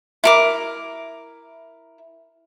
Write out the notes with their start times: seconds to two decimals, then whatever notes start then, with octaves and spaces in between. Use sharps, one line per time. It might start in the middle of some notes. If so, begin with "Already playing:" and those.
0.24 E4 A#4 D6